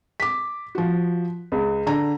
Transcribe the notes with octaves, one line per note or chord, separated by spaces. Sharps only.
D6 B6
F3 F#4
C#2
D3 A#5